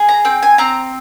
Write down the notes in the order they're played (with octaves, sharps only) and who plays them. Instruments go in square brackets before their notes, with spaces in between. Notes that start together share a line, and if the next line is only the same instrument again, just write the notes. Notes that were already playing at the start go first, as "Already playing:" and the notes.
Already playing: [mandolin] G#4
A#5
C4 G5
G#5
C4 A#5